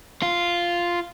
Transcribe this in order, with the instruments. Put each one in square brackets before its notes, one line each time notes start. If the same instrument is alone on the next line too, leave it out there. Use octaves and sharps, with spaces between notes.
[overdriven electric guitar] F4